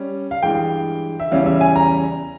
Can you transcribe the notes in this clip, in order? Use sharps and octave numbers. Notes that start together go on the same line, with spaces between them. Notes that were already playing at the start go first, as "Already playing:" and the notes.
Already playing: G3 C#4
F5
G2 E3 G#3 G5
E5
E2 C#3 E3 G3 C#4 F5
E5
G#5
A#5